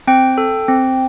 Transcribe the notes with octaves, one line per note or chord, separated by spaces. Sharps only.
C4 G5
A4
C4